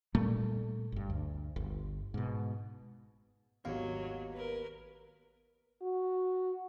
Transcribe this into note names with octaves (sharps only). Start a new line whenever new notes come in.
A#2 G3 A3 A#3
G1 G2
D2
G1
G#2 B2
G#1 D#2 F#3 B3 F5
A#4 B4
F#4